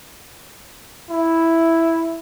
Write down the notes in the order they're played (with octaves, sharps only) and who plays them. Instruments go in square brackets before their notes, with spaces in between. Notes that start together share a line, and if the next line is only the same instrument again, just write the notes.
[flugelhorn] E4